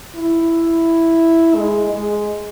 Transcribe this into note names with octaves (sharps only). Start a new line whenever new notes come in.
E4
G#3
G#3